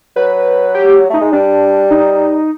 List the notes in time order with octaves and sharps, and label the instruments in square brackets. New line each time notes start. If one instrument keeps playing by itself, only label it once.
[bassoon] F#3 [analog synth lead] B4
[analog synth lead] G4
[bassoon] A3 [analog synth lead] D#4
[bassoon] G#3
[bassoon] G3 [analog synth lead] D4
[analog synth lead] D#4